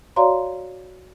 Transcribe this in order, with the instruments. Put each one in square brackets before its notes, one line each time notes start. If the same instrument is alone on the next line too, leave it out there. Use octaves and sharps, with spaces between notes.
[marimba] F#4 C#5 D5 F5 A#5 C6